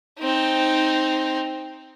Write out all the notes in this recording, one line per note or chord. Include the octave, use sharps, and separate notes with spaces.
C4 D#4